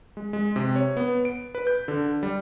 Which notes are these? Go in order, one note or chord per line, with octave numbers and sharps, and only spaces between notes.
G#3
G#3
C3
C#5
B3
D7
B4
G6
D3
G3